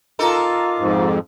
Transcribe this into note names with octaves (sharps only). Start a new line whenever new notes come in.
D#4 F4 A4 A#4 D6
F2 G#2